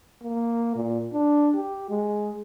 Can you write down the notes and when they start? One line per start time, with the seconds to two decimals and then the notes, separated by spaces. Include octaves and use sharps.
0.24 A#3
0.76 A#2
1.13 D4
1.55 G4
1.90 G#3